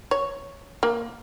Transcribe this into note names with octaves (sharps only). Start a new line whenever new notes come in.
C#5
A#3